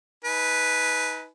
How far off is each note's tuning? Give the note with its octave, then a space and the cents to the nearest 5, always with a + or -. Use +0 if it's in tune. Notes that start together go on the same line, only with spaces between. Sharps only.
D#4 +35 B4 +0 G#5 +25